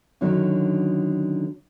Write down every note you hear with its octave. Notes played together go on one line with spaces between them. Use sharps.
F#2 D3 D#3 F#3 C#4 D4